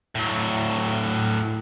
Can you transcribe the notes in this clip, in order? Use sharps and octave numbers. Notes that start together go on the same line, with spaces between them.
A2 F#3